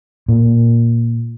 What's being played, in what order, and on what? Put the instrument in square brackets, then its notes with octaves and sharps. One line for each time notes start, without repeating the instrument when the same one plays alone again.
[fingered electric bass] A#2